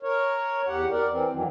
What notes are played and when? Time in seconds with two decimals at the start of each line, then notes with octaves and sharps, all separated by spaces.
0.03 A#4 C#5
0.67 E2 G4 F#5
0.90 A#4 D5
1.10 E3 C4
1.33 F2 D#3 E3 F#3